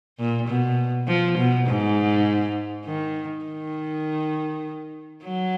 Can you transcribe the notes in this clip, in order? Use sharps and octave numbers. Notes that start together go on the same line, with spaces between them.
A#2
B2
F3
B2
G#2
D#3
D#3
F#3